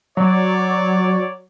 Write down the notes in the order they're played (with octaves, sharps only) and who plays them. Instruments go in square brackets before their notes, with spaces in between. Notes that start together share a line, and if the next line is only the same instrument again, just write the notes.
[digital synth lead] F#3 [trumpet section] C#5 D5